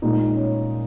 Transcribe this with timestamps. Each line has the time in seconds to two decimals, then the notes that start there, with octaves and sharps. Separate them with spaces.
0.02 A#2 G#3 D#4
0.35 C#4